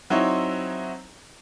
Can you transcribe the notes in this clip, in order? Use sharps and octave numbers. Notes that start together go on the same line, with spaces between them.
F#3 C4 D#4 E4 C#5